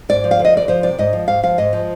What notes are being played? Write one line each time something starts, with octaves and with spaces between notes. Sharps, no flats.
G#2 D5
F3
F5
D2
D#5
D2 D5
F3 C5
C3 D5
G#2 D#5
F3
G#2 F5
F3 F5
G#2 D#5
F3